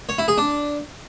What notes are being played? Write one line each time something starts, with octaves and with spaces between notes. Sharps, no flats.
C#5
E4
G#4
D4